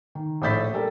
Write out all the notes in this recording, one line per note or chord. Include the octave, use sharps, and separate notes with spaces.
D#3
A#1 A2 E5 G6 A6 B6
G3 A4 A#4